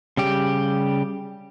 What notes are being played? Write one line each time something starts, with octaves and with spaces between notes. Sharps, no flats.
C#3 G3 G4